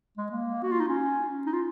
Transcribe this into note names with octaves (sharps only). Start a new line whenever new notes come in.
G#3
A#3
F#4
F4
D#4
C#4
D#4
F4